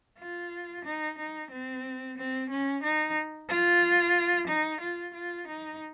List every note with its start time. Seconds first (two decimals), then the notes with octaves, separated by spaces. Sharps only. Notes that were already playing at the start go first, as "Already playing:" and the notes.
0.19 F4
0.85 D#4
1.18 D#4
1.51 C4
2.17 C4
2.50 C#4
2.83 D#4
3.49 F4
4.48 D#4
4.81 F4
5.14 F4
5.48 D#4